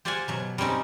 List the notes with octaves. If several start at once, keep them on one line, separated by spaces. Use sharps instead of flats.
G4 C5 D5 F5 F#5 G#5
B2 F#3
G3 C4 C#4 D#4